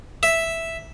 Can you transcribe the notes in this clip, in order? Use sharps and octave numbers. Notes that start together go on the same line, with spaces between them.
E5